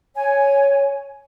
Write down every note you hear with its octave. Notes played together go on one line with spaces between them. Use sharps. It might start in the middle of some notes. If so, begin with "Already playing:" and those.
C#5 G#5